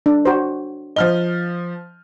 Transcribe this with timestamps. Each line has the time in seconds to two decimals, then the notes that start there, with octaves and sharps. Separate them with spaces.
0.06 D4
0.25 F#4 C5
0.96 F3 D#5 F6 G7